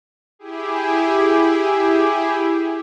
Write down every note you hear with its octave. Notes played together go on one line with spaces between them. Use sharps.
E4 G4 G#4